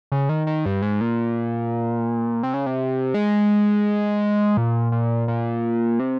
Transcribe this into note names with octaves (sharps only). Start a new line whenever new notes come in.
C#3
D#3
D#3
G2
G#2
A#2
C3
C#3
C3
G#3
A#2
A#2
A#2
C3